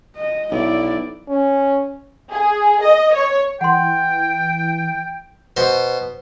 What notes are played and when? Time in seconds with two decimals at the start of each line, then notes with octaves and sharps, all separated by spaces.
0.16 D#5
0.51 B1 E4 D5
1.29 C#4
2.32 G#4
2.83 D#5
3.15 C#5
3.61 E3 F#5 G5 C6
5.57 B2 C5